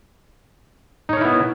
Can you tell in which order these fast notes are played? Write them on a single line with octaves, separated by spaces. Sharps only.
D#4 C#5 A#4 E4 B3